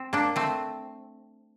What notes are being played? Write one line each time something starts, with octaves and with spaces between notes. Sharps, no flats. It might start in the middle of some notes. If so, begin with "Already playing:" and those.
Already playing: C4
A#3 D4
A3 C4